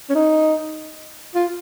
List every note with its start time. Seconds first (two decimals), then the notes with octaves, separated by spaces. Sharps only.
0.10 C#4
0.15 D#4
1.35 F4